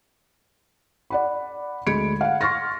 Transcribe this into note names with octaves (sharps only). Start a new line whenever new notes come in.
D5 F#5 B5
D2 G#3 B5 G#6 C#7 D7
F5 F#5
C6 C#6 F6 A6 A#6